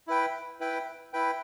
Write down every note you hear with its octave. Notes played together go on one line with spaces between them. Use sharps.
E4 B4 G5
E4 B4 G5
E4 B4 G5